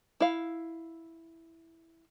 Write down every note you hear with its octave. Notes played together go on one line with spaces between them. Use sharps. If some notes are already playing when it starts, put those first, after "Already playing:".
E4 F5